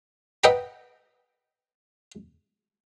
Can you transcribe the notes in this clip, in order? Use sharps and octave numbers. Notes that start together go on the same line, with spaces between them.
B4 D#5 F#5 G5 A#5 B5